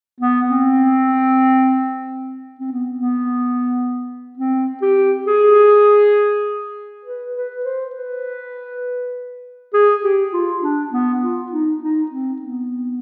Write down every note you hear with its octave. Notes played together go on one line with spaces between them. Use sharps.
B3
C4
C4
B3
B3
C4
G4
G#4
B4
B4
C5
B4
G#4
G4
F4
D4
B3
F4
D#4
D#4
C4
B3